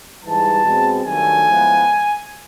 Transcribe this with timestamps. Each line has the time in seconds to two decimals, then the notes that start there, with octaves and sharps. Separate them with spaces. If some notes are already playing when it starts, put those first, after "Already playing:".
0.24 G#2 E3 G3 A5
0.64 B2 G#3 C4
1.04 G2 D#3 F#3 A3 G#5
1.45 A2 F3 G#3 B3